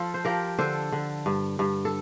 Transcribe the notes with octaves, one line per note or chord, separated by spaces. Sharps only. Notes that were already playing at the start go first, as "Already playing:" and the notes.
Already playing: F3 F4 A4
C5
F3 G4 A#4
D3 A4 C5
D3
G2
G2
A4